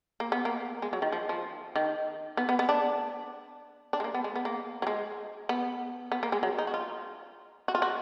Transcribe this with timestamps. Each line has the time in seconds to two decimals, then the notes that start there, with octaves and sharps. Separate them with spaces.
0.20 A#3
0.32 B3
0.45 A#3
0.82 G#3
0.93 F#3
1.02 D#3
1.12 F3
1.29 F3
1.76 D#3
2.37 B3
2.49 B3
2.59 B3
2.69 D4
3.93 D4
4.00 G#3
4.04 A#3
4.14 B3
4.24 G#3
4.36 B3
4.45 A#3
4.82 F#3
4.87 G#3
5.49 B3
6.12 B3
6.23 A#3
6.32 G#3
6.43 F#3
6.59 D#4
6.67 F#4
6.74 F4
7.68 F#4
7.75 F4
7.82 F#4